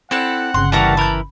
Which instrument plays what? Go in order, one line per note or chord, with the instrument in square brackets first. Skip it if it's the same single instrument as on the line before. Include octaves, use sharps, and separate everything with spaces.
[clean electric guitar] C4 [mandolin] E4 A4 D5 [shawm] F#5
[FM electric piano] G1 C#3 [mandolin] C6
[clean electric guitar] E3 G3 [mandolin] F#4 A#4 F#5 [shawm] A5
[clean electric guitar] E3 A#4 [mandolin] B5 G6